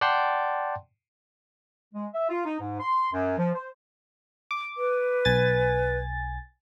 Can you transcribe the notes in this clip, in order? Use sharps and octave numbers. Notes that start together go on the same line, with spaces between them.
D5 F#5 G5 A5 C6
G#3
E5
F4
D#4
G#2
C6
F#2
F3
C5
D6
B4
B1 G#5 A6